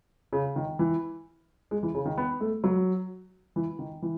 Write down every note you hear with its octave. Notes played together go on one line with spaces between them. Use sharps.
C#3
D#3
E3
G#3
E3
C#3
D#3
B3
A3
F#3
E3
D#3
E3